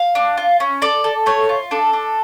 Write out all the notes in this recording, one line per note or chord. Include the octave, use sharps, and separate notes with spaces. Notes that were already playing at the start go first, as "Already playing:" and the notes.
Already playing: F5
D4
F4
C#4
A4 D5
A4
A3 C#5
F4
D4 A4
D4